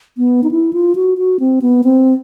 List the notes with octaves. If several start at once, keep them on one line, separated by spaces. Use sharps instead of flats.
B3
D#4
E4
F4
F#4
F#4
C4
B3
C4